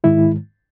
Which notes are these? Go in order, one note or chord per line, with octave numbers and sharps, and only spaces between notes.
G#2 D#3 G#3 E4